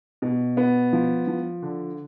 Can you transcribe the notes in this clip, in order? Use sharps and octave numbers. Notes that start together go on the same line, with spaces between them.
B2
B3
F3
F3
D3